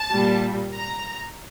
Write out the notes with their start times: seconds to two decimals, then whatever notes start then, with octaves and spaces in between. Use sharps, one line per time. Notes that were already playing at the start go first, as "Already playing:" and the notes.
Already playing: A5
0.12 A#2 G3
0.73 A#5